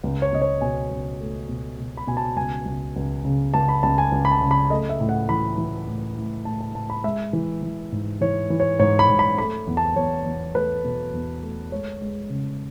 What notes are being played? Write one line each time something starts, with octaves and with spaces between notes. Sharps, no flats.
C#2
C#5
C#2 D#5
C#5
B2 G#5
C#2
A3
B2
B2
B5
B2 G#5
A5
C#2 G#5
C#2
C#2
C#3
C#2 A5
B5
C#2 A5
G#5
C#2
B5
A5
C#3
B5
A3 D#5
E5
A2
F#5
E3 B5
E3
A2
A2
A2 A5
A5
A2 A5
B5
G#3 E5
E3
E3
G#2
E3 C#5
E3
C#5
G#2 C#5
B5
G#2
B5
A3 B5
E2
A5
E2 C#5
E2
A3 B4
B2
E2
A3
G#3 C#5
G#3
C#3